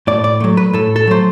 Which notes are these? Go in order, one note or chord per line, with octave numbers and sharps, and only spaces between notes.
A2 D5
D5
F#3 A3
B4
A2 A4
A4
F#3 A3 C5